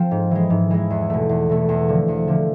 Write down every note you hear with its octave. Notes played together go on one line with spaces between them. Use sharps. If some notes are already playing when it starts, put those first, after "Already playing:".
Already playing: F3 C4
G#2
E3 G#3
G#2
E3 G#3
E2
B2 A3
E2
B2 A3
E2
D3 F3
E2
D3 F3